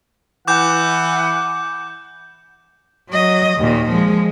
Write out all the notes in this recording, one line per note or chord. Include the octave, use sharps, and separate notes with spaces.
E3 F#5 D6 G6
F#3 D#5
D#2 A#2
F3 G#3